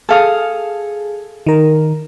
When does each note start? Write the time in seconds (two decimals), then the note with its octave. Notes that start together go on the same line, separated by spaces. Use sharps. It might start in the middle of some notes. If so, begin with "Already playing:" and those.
0.09 G#4 A4 F5 D#6
1.46 D#3 A#4